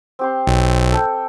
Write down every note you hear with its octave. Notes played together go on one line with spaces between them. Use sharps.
C4 G4 C6
B1
A4 G5